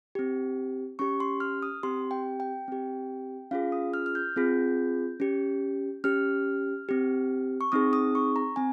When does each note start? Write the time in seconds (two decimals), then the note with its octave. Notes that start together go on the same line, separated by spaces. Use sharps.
0.15 C4 G4
0.99 C#4 G4 C#6
1.20 C6
1.40 F6
1.63 D#6
1.83 C4 G4 C6
2.11 G5
2.40 G5
2.68 C4 G4
3.51 C#4 F4 G#4 F5
3.72 D#6
3.94 F6
4.06 F6
4.15 G6
4.36 C4 F4 G#4
5.20 C#4 G4
6.04 C#4 G4 F6
6.89 C4 G4
7.61 C#6
7.72 C4 D#4 G#4 D#6
7.93 D#6
8.15 C#6
8.36 A#5
8.56 C4 G#5